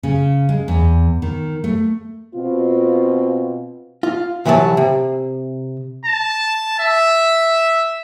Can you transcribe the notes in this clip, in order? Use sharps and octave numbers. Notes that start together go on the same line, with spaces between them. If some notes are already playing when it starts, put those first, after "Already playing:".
C#3
G#3
E2
D#3
A3
B2 C4 F4
F4
C2 E3 F#3 C5 A5
C3
A5
E5